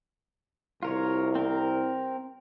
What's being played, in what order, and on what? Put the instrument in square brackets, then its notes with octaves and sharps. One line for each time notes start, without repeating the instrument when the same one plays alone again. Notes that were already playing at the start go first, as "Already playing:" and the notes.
[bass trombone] C2 [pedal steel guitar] F4 A#4 C#5
[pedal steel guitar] C4 A#4